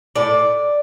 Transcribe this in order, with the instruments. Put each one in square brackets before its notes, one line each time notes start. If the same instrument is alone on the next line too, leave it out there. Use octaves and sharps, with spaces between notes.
[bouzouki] A2 D5